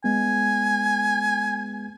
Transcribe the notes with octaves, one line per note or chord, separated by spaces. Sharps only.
G#3 B3 G#5